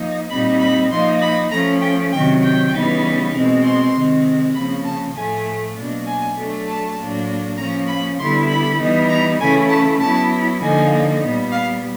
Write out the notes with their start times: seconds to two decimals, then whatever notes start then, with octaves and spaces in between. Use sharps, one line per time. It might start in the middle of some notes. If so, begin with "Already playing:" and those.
Already playing: F3 A#3 D#4
0.30 A#2 G3 C4 D#4 B5
0.60 B5
0.91 F3 A#3 D#4 C6
1.21 B5
1.51 F3 A3 C#4 A#5
1.82 G5
2.12 C3 D#3 F#3 G5
2.42 G5
2.72 C#3 E3 G3 B3 D#4
3.33 B2 G#3 C4
3.63 C6
3.94 C3 D#3 G#3 C4
4.54 C#3 F3 A#3 B5
4.84 A5
5.15 A2 F3 A3 G#5
5.76 B2 F#3 A#3 D4
6.06 G#5
6.36 F#3 A3 D4
6.67 A5
6.97 A2 F#3 A#3 D4
7.58 F3 A#3 C#4 A#5
7.88 B5
8.18 D3 G3 B3 E4 C6
8.48 B5
8.79 E3 G3 B3 D#4
9.09 A#5
9.40 C#3 E3 A3 C#4 E4 G#5
9.70 A5
10.00 F#3 B3 E4 A5
10.61 D3 F3 A#3 D#4 G#5
11.22 A#2 G3 B3
11.52 F5